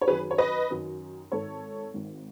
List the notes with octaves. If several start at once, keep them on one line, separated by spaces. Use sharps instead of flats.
C#5
F#2 D#3 F#3 G#4 B4
C#5
B4 D#5
F#2 D#3 F#3
G#1 G#2 D#3 A4 C#5
G#1 G#2 D#3